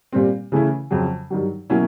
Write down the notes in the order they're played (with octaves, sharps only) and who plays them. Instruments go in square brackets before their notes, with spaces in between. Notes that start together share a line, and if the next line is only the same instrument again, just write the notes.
[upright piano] A#2 G3 C4
C#3 E3 A3 C#4 E4
F2 C#3 F#3
G2 D#3 F#3
B2 F#3 A#3 C#4 E4